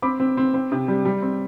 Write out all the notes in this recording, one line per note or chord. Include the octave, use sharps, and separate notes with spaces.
C4 B5 D6
C4
C4
C4
C3
G3
G3
C4